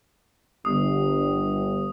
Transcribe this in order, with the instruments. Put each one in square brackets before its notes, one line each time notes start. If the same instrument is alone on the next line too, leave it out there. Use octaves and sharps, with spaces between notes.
[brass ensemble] G1 [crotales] D#6